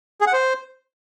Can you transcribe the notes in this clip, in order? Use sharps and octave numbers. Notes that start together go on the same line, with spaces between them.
G#4
F#5
C5